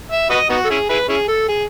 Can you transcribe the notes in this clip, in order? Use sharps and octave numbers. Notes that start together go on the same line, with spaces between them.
E5
F#4 B4 D#5
B3 D#4 F#4
A4
C#4 E4 G#4
E4 G#4 B4
C#4 E4 G#4
A4
G#4